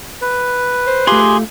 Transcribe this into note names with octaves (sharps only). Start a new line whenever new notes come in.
B4
C5
A3 F4 G4 G#4 C6